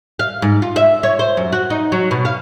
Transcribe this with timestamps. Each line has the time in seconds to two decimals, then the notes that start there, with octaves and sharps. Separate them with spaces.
0.19 F5
0.42 G#2
0.62 F4
0.76 E5
1.03 C#5
1.19 C5
1.37 F#2
1.52 F#4
1.70 D#4
1.92 F#3
2.11 B2
2.25 F5